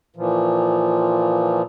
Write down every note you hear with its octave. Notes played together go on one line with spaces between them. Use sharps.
A#2 E3 F3